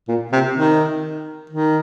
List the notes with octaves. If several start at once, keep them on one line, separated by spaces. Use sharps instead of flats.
A#2
C3
D#3
D#3